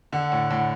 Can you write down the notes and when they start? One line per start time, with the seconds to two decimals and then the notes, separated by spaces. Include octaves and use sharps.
0.12 D3 F#5
0.32 A2
0.50 A2